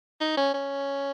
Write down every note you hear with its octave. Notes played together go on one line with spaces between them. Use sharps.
D#4
C#4
C#4